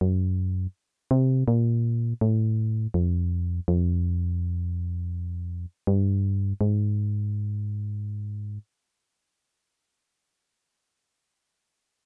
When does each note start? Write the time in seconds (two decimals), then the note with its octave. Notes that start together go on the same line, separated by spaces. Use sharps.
0.01 F#2
1.11 C3
1.48 A#2
2.21 A2
2.94 F2
3.68 F2
5.87 G2
6.61 G#2